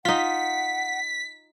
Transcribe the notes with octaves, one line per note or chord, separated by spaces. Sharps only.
D#4 F4 F#5 B6